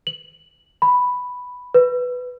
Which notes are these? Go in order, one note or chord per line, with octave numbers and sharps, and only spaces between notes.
F#7
B5
B4